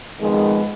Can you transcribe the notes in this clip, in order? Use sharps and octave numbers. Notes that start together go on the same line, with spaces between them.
F2 D#3 G#3 B3